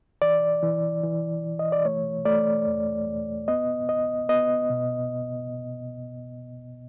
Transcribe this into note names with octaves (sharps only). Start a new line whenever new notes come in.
E3 D5
E3
E3
E3
D#5
D5
A3 C#5
A3 D5
E2
E2
B3 D#5
C#2 D#5
B3 D#5
B2